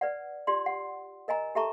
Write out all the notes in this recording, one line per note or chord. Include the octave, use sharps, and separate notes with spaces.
B4 D5 F#5
F4 G4 D5 C6
F#5
A#4 D#5 G#5 A#5
G4 A4 E5 A5 A#5 C#6